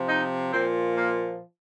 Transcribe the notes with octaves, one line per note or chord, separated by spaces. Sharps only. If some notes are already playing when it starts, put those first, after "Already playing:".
Already playing: C3 F3
D#4
A#2 F3 C4
A#3